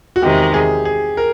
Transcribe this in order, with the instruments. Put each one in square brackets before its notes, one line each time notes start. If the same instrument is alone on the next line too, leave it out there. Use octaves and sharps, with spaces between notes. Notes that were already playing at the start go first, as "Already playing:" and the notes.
[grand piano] F#4
[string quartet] E2 C3 D#3 G#3 [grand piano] G4
[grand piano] G#4
G#4
A#4